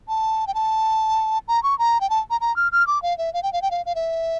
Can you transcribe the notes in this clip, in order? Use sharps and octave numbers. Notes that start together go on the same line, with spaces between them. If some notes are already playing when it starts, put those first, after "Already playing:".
A5
G5
A5
A#5
C#6
A#5
G5
A5
A#5
A#5
F6
F6
D6
F5
E5
F5
G5
F5
G5
F5
F5
E5